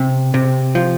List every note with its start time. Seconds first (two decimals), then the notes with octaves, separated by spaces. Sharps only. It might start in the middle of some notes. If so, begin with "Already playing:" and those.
Already playing: C3
0.34 C3
0.75 F3